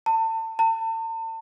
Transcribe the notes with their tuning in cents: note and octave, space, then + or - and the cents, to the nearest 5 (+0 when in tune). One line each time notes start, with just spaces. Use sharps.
A5 +35
A5 +40